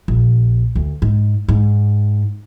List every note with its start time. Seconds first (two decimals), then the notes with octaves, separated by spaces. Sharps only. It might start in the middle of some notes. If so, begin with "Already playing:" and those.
0.08 A#1
0.75 D2
1.02 G#2
1.49 G#2